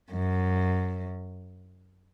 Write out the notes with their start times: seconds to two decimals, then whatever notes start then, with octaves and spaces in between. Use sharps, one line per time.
0.11 F#2